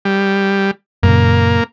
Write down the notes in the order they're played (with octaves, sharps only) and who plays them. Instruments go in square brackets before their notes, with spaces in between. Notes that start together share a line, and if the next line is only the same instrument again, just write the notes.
[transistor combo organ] G3
[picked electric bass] F#2 A#2 C#3 [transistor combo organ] A#3